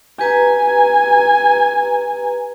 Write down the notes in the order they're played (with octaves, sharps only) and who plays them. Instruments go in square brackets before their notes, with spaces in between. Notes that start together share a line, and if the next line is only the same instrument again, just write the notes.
[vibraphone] G4 B4 A#5 [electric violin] G#5